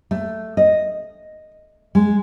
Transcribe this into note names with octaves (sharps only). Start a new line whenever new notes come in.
A3
D#5
G#3